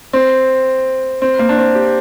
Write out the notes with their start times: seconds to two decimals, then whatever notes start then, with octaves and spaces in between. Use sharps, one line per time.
0.13 C4
1.22 C4
1.39 A#3
1.49 D4
1.58 C4
1.75 G4